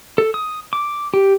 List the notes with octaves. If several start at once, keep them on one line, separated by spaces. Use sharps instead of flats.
A4
D#6
D6
G4